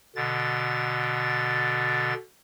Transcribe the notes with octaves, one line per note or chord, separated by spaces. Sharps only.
B2 D3 A6